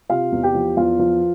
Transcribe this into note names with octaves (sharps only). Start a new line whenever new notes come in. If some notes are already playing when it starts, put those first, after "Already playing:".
C3 F4 F5
E2
G4 G5
F3
E2 F4 F5
F3